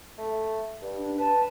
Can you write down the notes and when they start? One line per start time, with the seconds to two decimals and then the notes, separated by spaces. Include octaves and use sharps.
0.18 A3
0.82 G2
0.98 D4
1.18 B4 A5